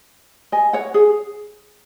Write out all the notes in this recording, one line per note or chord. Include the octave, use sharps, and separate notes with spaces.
D#5 G#5
C#5 F#5
G#4 C#5